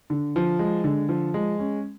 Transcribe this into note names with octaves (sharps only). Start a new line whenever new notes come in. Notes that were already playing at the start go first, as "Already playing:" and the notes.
D3
F3
G#3
D3
F3
G#3
C#4